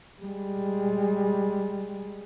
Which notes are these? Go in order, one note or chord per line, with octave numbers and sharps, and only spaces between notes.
G3 G#3